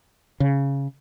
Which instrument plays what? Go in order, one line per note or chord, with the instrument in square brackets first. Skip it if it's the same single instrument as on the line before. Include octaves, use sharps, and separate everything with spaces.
[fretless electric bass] C#3